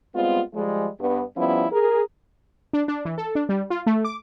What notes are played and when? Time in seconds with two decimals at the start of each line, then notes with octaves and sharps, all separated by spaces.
0.15 G3 G#3 B3 C4 F4
0.54 F3 G3 G#3
1.00 G2 B3
1.36 F3 G3 B3 C#4 E4
1.71 G#4 A#4
2.73 D4
2.88 D4
3.05 E3
3.18 A4
3.35 D4
3.49 G3
3.70 F4
3.87 A3
4.05 D6